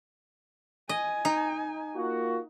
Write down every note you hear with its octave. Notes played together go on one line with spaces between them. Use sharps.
D#5 G#5
D#4
A#3 F4 F#4